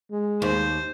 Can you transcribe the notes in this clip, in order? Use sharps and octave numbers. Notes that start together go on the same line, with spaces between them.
G#3
D#2 C5